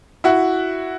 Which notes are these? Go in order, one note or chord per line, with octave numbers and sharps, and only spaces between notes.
E4 F#4